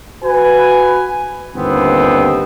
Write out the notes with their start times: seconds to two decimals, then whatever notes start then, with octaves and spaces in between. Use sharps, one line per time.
0.23 F#4 B4 G#5
1.56 G1 D#2 B3 C4